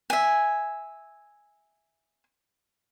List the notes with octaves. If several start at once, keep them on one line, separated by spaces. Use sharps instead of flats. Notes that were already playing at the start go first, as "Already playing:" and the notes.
E5 G#5